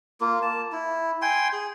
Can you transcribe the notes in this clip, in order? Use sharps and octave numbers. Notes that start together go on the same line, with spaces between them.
A#3 F4
A5
E4
G5 G#5 C6
G#4